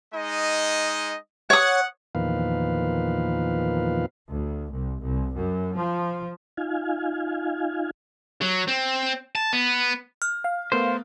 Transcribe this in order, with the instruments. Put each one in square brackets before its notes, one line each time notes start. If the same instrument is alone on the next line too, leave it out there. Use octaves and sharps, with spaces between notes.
[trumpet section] G#3 D#4 D#5
[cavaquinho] C#5 D#6 [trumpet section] F#5
[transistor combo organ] E2 A#2 D#3 F3 B4 F5
[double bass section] D2
C2
C2
F#2
F3
[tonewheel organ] D#4 F4 F5 G#5
[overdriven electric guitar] F#3
C4
A5
B3
[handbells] F6
[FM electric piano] F5
[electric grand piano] A3 B3 A#4 [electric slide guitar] C5